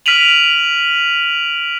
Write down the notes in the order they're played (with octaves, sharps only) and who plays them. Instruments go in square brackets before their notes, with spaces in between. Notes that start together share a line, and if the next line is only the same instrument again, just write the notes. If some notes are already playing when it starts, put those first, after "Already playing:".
[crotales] F6 B6 D7 D#7 F7 F#7